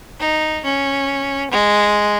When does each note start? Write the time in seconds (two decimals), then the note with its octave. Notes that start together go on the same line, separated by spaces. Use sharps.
0.20 D#4
0.64 C#4
1.51 G#3